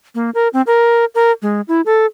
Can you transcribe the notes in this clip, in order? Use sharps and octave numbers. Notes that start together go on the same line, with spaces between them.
A#3
A#4
C4
A#4
A#4
G#3
E4
A4